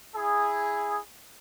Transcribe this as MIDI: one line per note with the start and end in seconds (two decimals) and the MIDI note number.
0.16 0.96 64
0.16 0.96 68